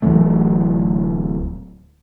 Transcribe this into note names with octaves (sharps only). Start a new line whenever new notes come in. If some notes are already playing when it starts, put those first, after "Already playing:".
D1 E3 F#3 A3